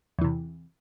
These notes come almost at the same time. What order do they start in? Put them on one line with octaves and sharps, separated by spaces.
E2 E3 C3